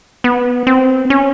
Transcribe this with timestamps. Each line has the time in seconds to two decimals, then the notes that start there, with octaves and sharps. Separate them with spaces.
0.24 B3
0.67 C4
1.10 C#4